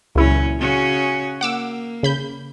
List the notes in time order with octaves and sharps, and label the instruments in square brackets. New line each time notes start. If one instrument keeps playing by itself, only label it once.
[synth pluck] C#2 E4 [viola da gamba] A#2 F#3 C#4
[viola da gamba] C#3 C#4 F#4
[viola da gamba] A#3 [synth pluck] F#5 D6 E6
[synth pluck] C#3 B5 G6